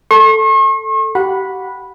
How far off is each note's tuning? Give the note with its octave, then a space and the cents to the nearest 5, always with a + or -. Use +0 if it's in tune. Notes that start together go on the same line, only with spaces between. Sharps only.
A4 +0 C#6 -45
G4 -35 F#5 -20 B5 -5